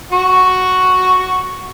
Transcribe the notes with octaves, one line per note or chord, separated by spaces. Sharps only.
F#4 C#6